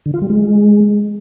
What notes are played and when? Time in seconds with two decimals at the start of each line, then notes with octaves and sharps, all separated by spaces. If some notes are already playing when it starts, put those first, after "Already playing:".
0.06 D3
0.14 F4
0.22 G3
0.30 G#3